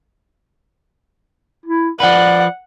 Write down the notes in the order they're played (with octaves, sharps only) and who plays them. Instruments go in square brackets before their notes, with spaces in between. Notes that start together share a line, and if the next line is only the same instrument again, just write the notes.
[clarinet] E4
[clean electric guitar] F3 B4 [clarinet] D5 [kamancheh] F#5